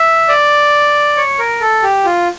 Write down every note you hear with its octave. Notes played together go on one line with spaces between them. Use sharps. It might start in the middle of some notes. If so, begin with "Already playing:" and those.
Already playing: E5
D5
C#5
A#4
A4
G4
F4